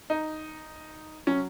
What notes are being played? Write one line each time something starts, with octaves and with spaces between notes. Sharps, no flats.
D#4
F#3 C#4